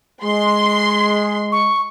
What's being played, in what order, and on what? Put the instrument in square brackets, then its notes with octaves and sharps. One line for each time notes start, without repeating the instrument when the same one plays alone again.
[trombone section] G#3 [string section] C6
[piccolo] C#6